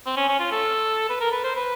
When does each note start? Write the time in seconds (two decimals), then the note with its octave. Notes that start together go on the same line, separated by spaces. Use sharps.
0.06 C4
0.17 C#4
0.28 C#4
0.39 F4
0.51 A4
1.09 B4
1.20 A#4
1.32 B4
1.44 C5
1.55 B4